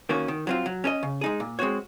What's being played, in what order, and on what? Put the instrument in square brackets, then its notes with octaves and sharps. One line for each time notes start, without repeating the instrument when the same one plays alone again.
[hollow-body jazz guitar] D#3 A#3 C#4 F#4
D#3
F#3 C4 F4
F#3
C#4 G#4 D#5
C#3
G#3 D#4 G#4
A#2
G#3 C4 F#4 C#5